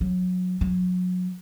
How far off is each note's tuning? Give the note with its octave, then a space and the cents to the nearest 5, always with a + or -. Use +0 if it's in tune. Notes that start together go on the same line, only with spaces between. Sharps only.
F#3 -25
F#3 -30